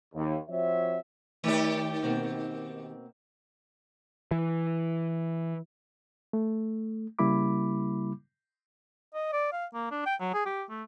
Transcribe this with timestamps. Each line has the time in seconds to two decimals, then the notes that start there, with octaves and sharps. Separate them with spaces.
0.14 D#2
0.49 F3 C4 F#4 C#5 E5
1.44 D#3 A3 G4 C#5 D5
2.02 B2 A#3 C4
4.31 E3
6.33 A3
7.19 C#3 G3 A#3 E4 B5 D6
9.14 D#5
9.33 D5
9.53 F5
9.74 A#3
9.91 D4
10.06 G5
10.21 F#3
10.34 G#4
10.46 G4
10.70 A3